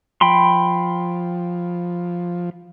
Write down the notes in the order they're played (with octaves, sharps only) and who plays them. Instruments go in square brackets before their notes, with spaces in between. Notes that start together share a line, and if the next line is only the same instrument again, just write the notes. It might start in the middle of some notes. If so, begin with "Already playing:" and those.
[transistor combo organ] F3 [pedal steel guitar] G5 B5 C6